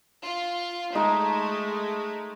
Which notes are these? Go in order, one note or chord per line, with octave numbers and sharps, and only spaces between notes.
F4
G#3 A3 D#4